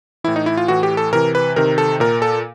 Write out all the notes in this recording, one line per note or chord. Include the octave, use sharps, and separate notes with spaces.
A2 E3 E4
D#4
E4
F4
A2 E3 F#4
G4
A4
C3 E3 A#4
B4
C3 D#3 A#4
A4
A#2 A#4
A4